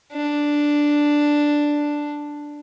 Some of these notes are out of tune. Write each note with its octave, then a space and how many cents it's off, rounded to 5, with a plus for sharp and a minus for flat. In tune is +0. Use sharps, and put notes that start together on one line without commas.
D4 +0